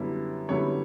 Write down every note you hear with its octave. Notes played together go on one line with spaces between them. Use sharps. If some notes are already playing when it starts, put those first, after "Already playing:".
Already playing: F#2 D3 G3 B3 E4
F#2 D3 G3 B3 E4 C#5